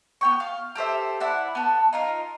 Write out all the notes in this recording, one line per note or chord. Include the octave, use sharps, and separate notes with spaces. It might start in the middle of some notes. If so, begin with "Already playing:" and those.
B3 G5 C#6
F5
G4 A4 C5 E5
E4 D5 F#5
B3 A4
D#4 F4 A#4